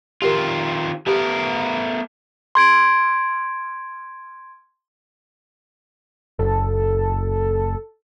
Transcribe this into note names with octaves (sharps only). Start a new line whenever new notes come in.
D#3 C4 F4 G4 A#4
A3 B3 G4 A#4
C6 G#6 D7
F#1 A4